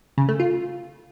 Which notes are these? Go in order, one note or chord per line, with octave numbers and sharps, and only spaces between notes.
C#3
A3
F4